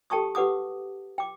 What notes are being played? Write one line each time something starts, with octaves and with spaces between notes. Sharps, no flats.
G4 A4 G5 A5 C#6 D#6
G4 B4 F#5 D6 D#6
G5 D6